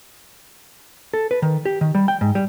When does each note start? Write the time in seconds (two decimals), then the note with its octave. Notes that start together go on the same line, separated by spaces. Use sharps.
1.14 A4
1.31 B4
1.42 D#3
1.65 G4
1.81 D#3
1.95 G3
2.08 G5
2.21 G#2
2.35 G3